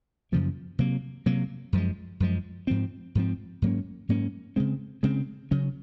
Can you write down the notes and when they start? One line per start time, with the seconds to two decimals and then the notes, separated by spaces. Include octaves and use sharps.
0.32 F#2 C#3 F3 A#3
0.79 C3 F#3 A#3
1.26 C3 F#3 A#3
1.73 F#2 F3 G#3
2.20 F#2 F3 G#3
2.67 G#2 F3 C4
3.15 G#2 F3 C4
3.62 G#2 F#3 A#3 C#4
4.09 G#2 F#3 A#3 C#4
4.56 C#3 G#3 C4
5.03 C#3 G#3 C4
5.51 C#3 F#3 C#4